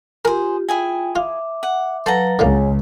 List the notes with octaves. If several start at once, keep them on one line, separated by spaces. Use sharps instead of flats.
F4 G4 G#4 A#4 C5
E4 F4 G#4 G5 G#5
F4 E5 D6
F#5
F#3 A4 B4 C5 F5 F#5 A#5
C#2 D3 E3 A#3 G#4 C#5 G#5